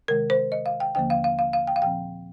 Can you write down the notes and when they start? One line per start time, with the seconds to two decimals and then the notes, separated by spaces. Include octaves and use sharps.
0.08 C3 D#3 G#3 A#4
0.30 C5
0.52 D#5
0.66 F5
0.80 G5
0.95 D#2 D3 F3 A#3 G5
1.10 F5
1.24 F5
1.39 F5
1.53 F5
1.67 G5
1.76 F5
1.82 A#2 F3 C4 G5